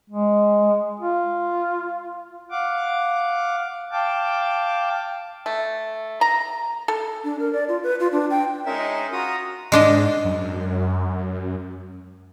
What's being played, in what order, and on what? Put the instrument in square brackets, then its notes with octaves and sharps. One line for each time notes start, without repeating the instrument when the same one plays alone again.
[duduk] G#3
F4
[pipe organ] F5 F#5 D6
F5 G5 A5 D6
[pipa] A3
A#5
A4
[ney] D4
A#4
D5
F4
B4
F4
D4
G5
[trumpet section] G#3 D#4 [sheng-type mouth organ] C#4 A#4 E5
[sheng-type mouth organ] F4 F#4 D#6 [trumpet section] A#5
[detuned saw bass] G#2 [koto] G#3 D4 D#5
[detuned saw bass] F#2